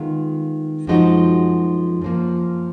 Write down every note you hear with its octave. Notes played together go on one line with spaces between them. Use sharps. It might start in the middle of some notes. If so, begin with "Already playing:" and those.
Already playing: D#3 G#3 B3 F4
F#2 F3 G#3 D#4 F#4
F#2 F3 A#3